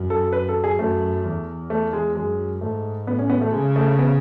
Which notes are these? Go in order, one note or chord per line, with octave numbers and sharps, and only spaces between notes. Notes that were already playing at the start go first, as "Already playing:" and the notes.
Already playing: F#2
A4
B4
A4
G#4
F#2 A3
E2
A3
G#3
F#2 G#3
G#2 A3
A2 B3
C#4
B3
A3
C#3 G#3
A3
B3